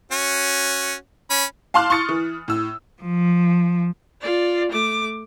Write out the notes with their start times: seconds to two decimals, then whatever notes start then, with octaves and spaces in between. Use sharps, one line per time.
0.12 C#4 F#4
1.30 C#4 B5
1.74 F5 A5 C6 D6 F6 F#6
1.90 C6 C#6 D#6 A6 C#7
2.09 E3
2.48 A2 E6
3.03 F3
4.21 F4 D5
4.72 A3 D6